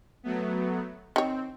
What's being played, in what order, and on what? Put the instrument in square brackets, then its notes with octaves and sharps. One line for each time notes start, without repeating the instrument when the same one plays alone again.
[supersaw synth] F#3 A3 B3
[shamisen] D#3 C#5 [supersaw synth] C4